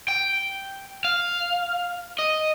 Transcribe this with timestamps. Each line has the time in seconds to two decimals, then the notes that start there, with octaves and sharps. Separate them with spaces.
0.08 G5
1.05 F5
2.19 D#5